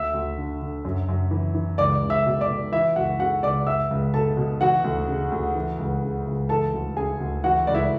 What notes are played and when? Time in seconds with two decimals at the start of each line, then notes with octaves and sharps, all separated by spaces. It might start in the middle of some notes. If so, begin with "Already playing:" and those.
Already playing: D2 E5 E6
0.14 D2
0.37 D3
0.62 D3
0.85 F#2
1.09 F#2
1.31 E3
1.55 E3
1.78 C#2 D5 D6
2.03 C#2
2.10 E5 E6
2.26 B2
2.41 D5 D6
2.49 B2
2.72 E3 E4 E5
2.96 C#2 F#4 F#5
3.19 C#3 F#4 F#5
3.43 C#2 D5 D6
3.67 C#2 E5 E6
3.91 C#2
4.14 B2 A4 A5
4.37 B2
4.61 E3 F#4 F#5
4.84 D2
5.08 C#3
5.31 D2
5.55 E3
5.79 C#2
6.03 C#3
6.26 C#2
6.49 E3 A4 A5
6.73 D2
6.97 C#3 G#4 G#5
7.20 D2
7.44 E3 F#4 F#5
7.67 C#2 D5
7.75 E4 E5